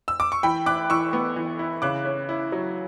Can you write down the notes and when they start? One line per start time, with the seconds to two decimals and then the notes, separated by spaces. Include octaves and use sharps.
0.08 E6
0.20 D6
0.32 C#6
0.43 E3 G5 B5
0.66 E4 D6 F#6
0.90 E3 C#6 E6
1.13 B3
1.36 E3
1.59 E4
1.82 C#3 D6 F#6
2.05 C#4
2.29 E4
2.52 F#3